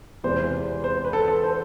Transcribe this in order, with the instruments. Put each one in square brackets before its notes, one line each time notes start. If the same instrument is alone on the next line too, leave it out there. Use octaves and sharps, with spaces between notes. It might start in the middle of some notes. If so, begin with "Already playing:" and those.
[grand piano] E2 C3 G#3 B3 [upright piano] C5
[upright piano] C5
B4
A4
A4
C5